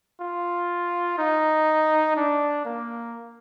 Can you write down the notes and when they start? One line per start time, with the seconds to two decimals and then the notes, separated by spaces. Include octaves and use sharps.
0.21 F4
1.18 D#4
2.16 D4
2.65 A#3